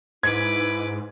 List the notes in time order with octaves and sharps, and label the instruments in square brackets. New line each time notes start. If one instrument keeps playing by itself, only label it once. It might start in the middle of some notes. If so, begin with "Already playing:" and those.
[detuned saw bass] G#2 [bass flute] E4 [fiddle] B4 D6 [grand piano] G#6